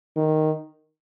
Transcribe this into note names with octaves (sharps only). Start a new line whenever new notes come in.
D#3